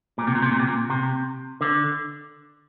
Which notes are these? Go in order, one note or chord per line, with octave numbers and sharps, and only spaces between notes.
A#2
C3
A#2
C3
A#2
C3
A#2
C3
D3